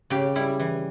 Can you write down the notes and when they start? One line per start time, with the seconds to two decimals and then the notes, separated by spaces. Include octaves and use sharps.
0.10 C#3 G4
0.35 G3 E4
0.60 E3